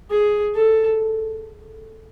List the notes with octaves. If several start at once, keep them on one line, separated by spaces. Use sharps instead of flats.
G#4
A4